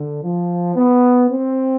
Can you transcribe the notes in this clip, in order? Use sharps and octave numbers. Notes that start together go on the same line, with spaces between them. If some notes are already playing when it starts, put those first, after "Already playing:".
Already playing: D3
F3
B3
C4